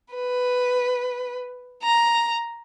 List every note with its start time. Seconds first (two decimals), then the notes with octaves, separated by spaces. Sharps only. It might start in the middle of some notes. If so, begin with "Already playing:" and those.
0.14 B4
1.83 A#5